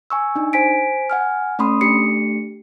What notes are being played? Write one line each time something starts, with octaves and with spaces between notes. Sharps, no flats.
G#5 C#6 E6
D4 D#4
C5 G#5 B6 D7
F#5 G#5 F6
A3 C#4 B5 C6 D#6
A3 D4 G4 C7 C#7